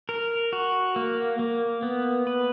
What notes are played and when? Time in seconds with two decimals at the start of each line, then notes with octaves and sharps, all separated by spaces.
0.09 A#4
0.53 F#4
0.96 A#3
1.39 A#3
1.83 B3
2.27 B4